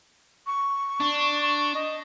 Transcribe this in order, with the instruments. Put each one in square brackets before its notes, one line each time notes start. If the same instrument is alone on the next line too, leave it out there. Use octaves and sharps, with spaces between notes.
[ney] C#6
[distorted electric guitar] D4
[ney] C#6
D#5